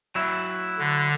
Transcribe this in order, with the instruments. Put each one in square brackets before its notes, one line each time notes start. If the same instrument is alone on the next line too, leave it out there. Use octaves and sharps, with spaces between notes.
[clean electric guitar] F#3 E4
[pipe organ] D3